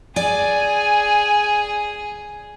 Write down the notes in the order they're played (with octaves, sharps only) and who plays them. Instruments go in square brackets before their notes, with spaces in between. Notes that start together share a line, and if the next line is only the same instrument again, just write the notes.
[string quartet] G#4 [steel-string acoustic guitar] D5 [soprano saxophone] G#5